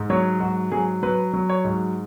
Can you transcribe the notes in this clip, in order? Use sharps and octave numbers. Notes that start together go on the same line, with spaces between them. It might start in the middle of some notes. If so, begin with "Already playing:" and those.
Already playing: G#2
F#3 C#5
G#2 F#4
F#3 G#4
F#3 B4
F#3
C#5
G#2